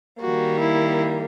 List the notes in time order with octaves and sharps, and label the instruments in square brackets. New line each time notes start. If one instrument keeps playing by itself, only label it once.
[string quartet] D#3 G3 A#3 [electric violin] F#4
[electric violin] E4